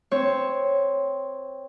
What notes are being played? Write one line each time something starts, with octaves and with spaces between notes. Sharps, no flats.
C4 C#5